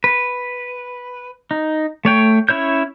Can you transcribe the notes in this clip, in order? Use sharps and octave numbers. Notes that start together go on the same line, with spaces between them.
B4
D#4
A3 C#5 G5
C#4 E4 C#5 G6